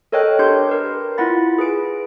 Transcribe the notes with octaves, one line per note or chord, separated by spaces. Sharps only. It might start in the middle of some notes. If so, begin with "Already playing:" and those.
A4 A#4 C#5 D#5 G5 F#6
D4 G4 C6 G6
A#4 B4
E4 F4 F#5 B5 A6
G#4 B4 D7